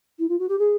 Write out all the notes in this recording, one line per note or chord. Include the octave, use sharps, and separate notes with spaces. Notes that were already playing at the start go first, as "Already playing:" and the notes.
E4
F4
F#4
G4
G#4